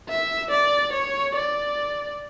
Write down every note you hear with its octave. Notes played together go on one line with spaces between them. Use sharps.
E5
D5
C#5
D5